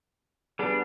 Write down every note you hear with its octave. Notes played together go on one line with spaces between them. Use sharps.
G3 B3 D4 G#4